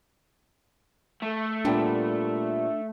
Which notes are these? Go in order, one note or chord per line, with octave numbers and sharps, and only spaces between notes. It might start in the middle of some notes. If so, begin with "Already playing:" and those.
A3
A#2 G3 B3 D4